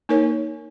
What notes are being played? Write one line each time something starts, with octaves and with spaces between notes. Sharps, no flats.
A#3 D#4 A#4 C#5